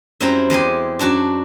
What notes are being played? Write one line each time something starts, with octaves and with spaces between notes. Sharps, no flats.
F#2 G3 C4 E4 F4 A#5
E2 G#3 G4 G#5
F#2 D4 F#4 A5